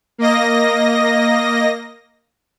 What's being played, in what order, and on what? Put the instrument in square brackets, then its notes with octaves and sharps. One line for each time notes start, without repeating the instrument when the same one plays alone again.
[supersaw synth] A#3 D#5 A#6